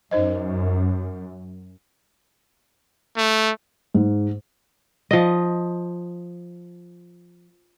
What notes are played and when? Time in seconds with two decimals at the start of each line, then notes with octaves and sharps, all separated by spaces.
0.11 F#2 D#4 C5 D#5
3.17 A3
3.94 G#2
5.11 F3 D#5